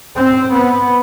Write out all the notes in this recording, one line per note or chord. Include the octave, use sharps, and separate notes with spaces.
C4
B3